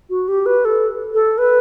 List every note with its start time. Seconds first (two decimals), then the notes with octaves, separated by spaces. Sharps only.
0.10 F#4
0.28 G4
0.46 B4
0.65 A4
1.14 A4
1.38 B4